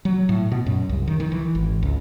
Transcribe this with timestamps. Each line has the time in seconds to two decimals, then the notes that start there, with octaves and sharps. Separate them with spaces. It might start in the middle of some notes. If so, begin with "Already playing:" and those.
0.05 F#3
0.29 A2
0.52 B2
0.66 F#2
0.89 C2
1.08 D#3
1.20 D#3
1.32 E3
1.55 G#1
1.83 C#2